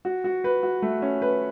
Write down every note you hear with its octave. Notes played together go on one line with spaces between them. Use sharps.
F#4
F#4
B4
F#4
A3
C#4
B4